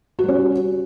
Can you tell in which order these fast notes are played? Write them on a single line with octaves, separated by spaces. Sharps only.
F#4 G3 C#4